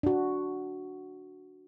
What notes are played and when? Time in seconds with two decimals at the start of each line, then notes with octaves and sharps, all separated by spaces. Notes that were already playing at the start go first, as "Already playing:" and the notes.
0.03 D4 F#4